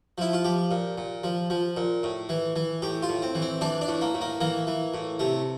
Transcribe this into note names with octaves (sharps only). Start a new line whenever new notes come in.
F3 E4
F4
F3 G4
A#2
A#2
F3
F3
A#2
A2
E3
E3
A2 G4
F4
A2
C4
E3
C4
E3 D4
D4
A2
A#3
A2
A#3
E3 A#3
E3
A2
C3 A3